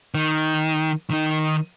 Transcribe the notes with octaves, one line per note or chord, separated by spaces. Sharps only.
D#3
D#3 D#4